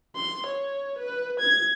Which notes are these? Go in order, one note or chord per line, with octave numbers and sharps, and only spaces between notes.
C6
C#5
B4
G#6